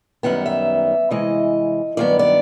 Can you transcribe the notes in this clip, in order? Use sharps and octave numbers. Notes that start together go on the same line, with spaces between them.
F#2 D#3 G3 B3 F#5
E5
C3 E3 G#3 D#5
G2 D#3 F#3 B3 D5
D5